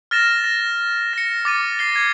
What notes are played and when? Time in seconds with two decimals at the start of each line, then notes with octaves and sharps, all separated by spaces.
0.11 F6 A6 A#6 E7
0.44 A#6
1.13 A#6 C#7
1.45 D6 A6 D#7 E7
1.79 A6 C7 G7
1.96 G#6